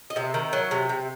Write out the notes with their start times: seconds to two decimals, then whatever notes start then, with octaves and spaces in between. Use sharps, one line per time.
0.10 D#5
0.16 C3 E5
0.34 D#3
0.53 F#3
0.71 C3
0.89 C3